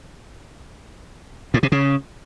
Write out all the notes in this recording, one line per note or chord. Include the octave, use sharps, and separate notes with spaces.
A2
C3
C#3